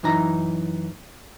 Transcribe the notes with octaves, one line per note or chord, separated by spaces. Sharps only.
F#2 E3 D#4 A#5